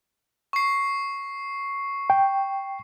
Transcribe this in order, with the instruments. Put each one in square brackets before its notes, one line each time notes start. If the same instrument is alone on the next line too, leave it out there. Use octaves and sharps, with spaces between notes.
[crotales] C#6 C7
[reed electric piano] G5